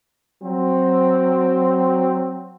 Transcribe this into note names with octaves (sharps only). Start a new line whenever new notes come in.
F#3 C4